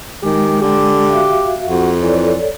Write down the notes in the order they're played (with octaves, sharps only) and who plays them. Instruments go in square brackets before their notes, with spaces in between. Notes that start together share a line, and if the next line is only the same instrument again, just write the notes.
[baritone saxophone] D#3 [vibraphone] G#3 [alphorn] G4
[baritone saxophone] D3 [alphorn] G4
[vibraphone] F#4 E5 F5
[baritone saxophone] F2 [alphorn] F#4
[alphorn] E3 [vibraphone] A4 C#5 D5